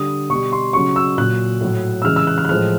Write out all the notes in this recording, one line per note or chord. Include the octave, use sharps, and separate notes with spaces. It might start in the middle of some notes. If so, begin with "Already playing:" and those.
Already playing: D3 G3 D#6
B2 G3 C#6
C6
C#3 F#3 C#6
E6
A#2 F#3 F#6
A2 F#3
E6
C#3 E3 G#3 F6
E6
F#6
F6
F#6
A2 F3 G#3 F6